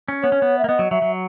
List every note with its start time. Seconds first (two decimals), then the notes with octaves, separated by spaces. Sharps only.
0.08 C#4
0.22 B3 C#5
0.32 C#4
0.42 B3
0.59 E5
0.64 A#3
0.68 B3 D#5
0.79 F#3
0.91 F#3 E5
1.02 F#3